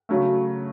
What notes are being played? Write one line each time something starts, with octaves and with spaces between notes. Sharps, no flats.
C#3 F#3 A3